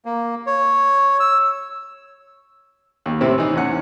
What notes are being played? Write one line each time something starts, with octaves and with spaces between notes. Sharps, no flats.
A#3
C#5
E6
D#2
A2 C3 C4 E4
E3 D#4
E2 C#4 F#5